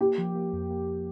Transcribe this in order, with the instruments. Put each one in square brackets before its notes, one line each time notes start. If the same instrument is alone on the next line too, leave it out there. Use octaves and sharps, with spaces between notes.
[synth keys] A#3 [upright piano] G4
[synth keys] F3
A#3
F2
A#3